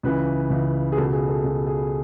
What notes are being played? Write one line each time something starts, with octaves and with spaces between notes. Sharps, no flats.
C#2 C#3 E3 B4
C#2 C#3 E3
G#4
C#2 B2 A4
G#4
A4
C#2 B2
G#4